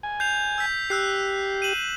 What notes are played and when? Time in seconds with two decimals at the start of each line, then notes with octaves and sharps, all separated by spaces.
0.03 G#5
0.20 G6 C7 F7
0.58 E6 G6 B6
0.90 G4 E6 F#6 C7
1.62 D#7 E7 F#7